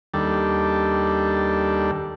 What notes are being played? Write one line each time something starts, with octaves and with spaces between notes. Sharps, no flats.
D#2 G3 D4 A4